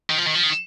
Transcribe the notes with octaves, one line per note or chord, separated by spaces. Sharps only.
D#3
F3
D#3
F3
D#3